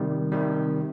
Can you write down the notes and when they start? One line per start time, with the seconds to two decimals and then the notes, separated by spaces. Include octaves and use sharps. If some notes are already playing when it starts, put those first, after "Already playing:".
Already playing: C3 D#3 G3
0.32 C3 D#3 G3